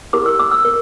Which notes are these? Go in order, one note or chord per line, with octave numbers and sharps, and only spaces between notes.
E4 G4 A#4 D6
E6
D6
E6
A#4